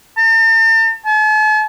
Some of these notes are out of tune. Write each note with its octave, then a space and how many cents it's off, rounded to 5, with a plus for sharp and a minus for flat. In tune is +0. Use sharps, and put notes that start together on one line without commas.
A5 +45
A5 -45